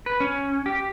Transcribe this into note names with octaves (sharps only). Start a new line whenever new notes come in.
B4
C#4
G4